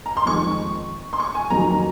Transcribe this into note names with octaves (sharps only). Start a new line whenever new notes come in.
A#5
C6
F2 D#3 G#3 C#6
C6
C#6
G#5
F2 D#3 F#3 A#3 A#5